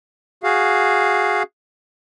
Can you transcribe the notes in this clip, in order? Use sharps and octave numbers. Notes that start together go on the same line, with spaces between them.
F#4 G#4 F5